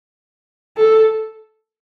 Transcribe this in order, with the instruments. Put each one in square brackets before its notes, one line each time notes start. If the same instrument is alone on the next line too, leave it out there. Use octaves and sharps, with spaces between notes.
[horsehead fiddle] A4